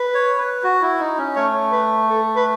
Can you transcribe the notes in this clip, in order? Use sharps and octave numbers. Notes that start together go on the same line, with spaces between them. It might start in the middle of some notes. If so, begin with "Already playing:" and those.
Already playing: B4
C#5
B4
F#4
E4
D#4
C#4
A3 C#5
B4
A4
B4